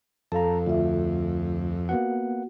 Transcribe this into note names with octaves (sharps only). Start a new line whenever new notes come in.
F2 A4 F5 A5 A#5
D2 F4 E5
A#3 B3 F#4 F#5